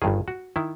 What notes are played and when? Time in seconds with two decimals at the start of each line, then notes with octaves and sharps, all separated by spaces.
0.02 G1 G2 D#3 G#4
0.28 F#4
0.56 D#3 E4